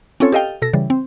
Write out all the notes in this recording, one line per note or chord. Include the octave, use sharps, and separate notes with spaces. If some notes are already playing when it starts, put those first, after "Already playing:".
C4 C#4 F4 A4 C#5
G4 A4 D#5 F5 G5
B2 A4 A#6
C#3 E3 G3
C4